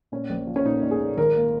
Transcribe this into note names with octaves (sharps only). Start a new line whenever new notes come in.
A#2 C#4
A#1
F3
C#4
A#2 D#4
A#2
G#4
A#2
G#1 A#4
A#3